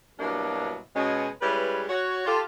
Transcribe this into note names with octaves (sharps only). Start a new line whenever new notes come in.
G2 B2 F#3 A#3 D4 E4
B2 G#3 C#4
G3 G#3 C#4 E4 B4
F#4 C#5
F4 G4 A4